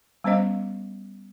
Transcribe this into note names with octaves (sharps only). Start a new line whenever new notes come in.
G3 B3 C#4 C5 D#5 F5